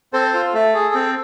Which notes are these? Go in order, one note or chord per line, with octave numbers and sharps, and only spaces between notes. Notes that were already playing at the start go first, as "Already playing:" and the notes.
C4 A4 C5
F4
A3 A4
G#4
C4